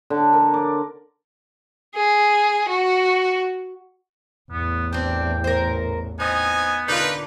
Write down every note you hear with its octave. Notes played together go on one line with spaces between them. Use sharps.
D3
A#4
D5
G#4
F#4
A1 E2 B3
C4 D4 G5
A#4 C5
B3 C4 D#4 D#5 G#5
D3 A#3 D4 D#4 F4 B4